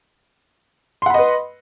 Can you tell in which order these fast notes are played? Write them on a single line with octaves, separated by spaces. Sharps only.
C6 F#5 B5 D#5 B4